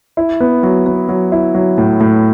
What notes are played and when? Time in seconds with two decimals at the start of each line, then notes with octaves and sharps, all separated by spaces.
0.17 E4
0.41 B3
0.63 F#3
0.86 B3
1.09 F#3
1.32 E4
1.54 F#3
1.78 A2
2.00 A2